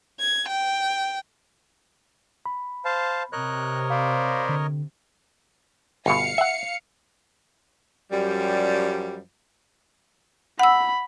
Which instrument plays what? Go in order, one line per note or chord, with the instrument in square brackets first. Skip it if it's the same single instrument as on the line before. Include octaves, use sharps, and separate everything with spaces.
[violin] G#6
G5
[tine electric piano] B5
[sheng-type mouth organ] C5 F5 A5
[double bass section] C3 [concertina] A#4 C#5 D#5 [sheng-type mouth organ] F#6
[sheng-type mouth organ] C5 D5 B5 [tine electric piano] F5
[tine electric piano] D3
[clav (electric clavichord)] G1 B2 [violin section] F5 C#7
[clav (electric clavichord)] E5 F#5
[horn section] F#2 F3 G3
[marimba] F#5 E6 [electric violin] B5